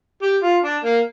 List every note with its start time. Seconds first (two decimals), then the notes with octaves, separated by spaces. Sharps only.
0.22 G4
0.43 F4
0.63 D4
0.83 A#3